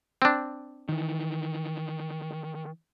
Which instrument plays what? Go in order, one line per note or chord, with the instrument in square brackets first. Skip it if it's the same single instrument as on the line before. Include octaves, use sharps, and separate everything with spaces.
[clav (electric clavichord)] C4 D4
[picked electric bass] D#3 E3